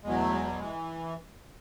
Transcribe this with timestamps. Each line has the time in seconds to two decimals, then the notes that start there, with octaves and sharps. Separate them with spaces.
0.03 E2 B2 F#3 G#3
0.18 A3
0.31 G#3
0.45 G3
0.59 E3 G#3